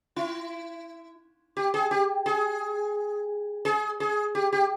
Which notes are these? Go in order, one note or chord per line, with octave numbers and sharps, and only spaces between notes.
E4
G4
G#4
G4
G#4
G#4
G#4
G4
G4